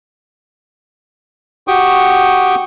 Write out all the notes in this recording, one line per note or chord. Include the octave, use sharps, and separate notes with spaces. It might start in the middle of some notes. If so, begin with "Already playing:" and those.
F#4 G4 G5 C#6 D#6